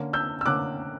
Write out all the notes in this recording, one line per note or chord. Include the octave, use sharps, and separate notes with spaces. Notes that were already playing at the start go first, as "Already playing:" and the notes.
Already playing: D3 A#3 C#4
E6 G6
E6
D3 A#3 C#4 D6 F#6